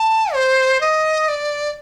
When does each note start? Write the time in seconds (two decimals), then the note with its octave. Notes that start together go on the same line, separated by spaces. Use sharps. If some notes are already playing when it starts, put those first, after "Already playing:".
Already playing: A5
0.34 C5
0.81 D#5
1.28 D5